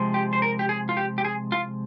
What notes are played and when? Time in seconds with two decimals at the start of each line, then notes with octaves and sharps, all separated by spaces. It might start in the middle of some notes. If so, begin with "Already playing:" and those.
Already playing: C3 F3 G#3
0.14 G4
0.33 C5
0.42 A#4
0.59 G4
0.69 G#4
0.89 F4
0.97 G4
1.18 G4
1.25 G#4
1.52 F4